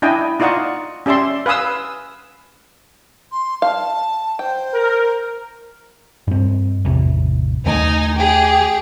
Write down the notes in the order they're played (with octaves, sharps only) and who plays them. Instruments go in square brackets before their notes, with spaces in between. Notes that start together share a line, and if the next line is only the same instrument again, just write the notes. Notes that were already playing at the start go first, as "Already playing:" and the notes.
[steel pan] D4 E4 D#5 G5 G#5
D#4 F4 D5 D#5 F#5 C#6
C#4 G4 D5 E5 C6
B4 F5 G#5 D#6 E6
[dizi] C6
[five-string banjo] F5 [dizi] A5
[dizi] C5 [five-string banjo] G5
[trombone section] A#4
[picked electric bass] G2 C4
A1 E2 C3
[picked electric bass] D#2 D#3 A3 [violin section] D#4 G#5
[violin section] G4 G#4